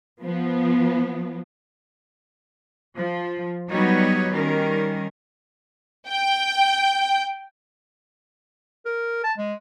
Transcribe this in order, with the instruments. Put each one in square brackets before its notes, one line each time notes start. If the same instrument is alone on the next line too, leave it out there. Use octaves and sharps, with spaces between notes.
[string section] F3 B3
[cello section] F3
F#3 G3 B3 D#4 F#4 C#5
D#3 G3 C#4 A#4
[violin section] G5
[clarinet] A#4
A5
G#3